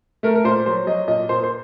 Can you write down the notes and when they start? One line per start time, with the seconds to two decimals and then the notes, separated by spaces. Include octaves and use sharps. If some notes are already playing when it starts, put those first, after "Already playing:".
0.23 A3 A#4
0.35 A#4
0.44 A#2 C5
0.66 F#3 C5
0.87 F#3 D#5
1.08 A#2 D#5
1.29 A#2 C5
1.43 C5